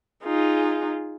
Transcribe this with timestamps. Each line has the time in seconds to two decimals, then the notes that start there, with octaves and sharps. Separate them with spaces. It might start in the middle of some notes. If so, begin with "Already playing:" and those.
0.24 D#4 F4 G#4